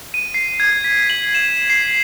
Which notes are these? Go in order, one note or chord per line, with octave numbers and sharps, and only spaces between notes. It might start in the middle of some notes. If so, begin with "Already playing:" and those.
D#7
C7
G#6
B6
F#7
E7
C7